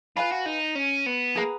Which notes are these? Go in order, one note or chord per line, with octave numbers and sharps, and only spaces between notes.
F4 B4 F5 G#5 B5
F#4
D#4
C#4
B3
A#3 G#4 B4 F#5 A#5